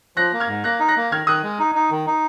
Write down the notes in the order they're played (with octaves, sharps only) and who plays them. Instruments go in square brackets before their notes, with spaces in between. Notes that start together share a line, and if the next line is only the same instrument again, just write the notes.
[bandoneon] F3 [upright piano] F#6 A#6
[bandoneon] A#3
[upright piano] F6 G#6
[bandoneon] G#2
[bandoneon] A#3 [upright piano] F#6 A#6
[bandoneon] D#4
[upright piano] F#6 A#6
[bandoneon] A#3
[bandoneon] D#3 [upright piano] F6 G#6
[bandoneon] D#3 [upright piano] D#6 F#6
[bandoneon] G#3
D#4
D#4
D#3
D#4